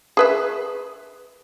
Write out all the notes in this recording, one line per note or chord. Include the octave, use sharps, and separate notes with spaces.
G#4 B4 E5